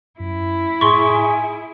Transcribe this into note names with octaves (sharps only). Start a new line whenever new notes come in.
F#2 E4
A2 G#4 C6 C#6
G#5